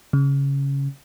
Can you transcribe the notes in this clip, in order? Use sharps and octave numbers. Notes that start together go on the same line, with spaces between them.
C#3